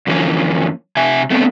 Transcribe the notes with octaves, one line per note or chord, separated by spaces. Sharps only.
F#2 D3 E3 F3 A#3 C#4
C3 E5 G#5
A3 B3 C4 D4